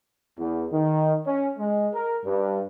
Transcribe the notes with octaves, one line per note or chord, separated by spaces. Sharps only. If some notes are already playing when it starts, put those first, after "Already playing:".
E2
D#3
C#4
G#3
A#4
G2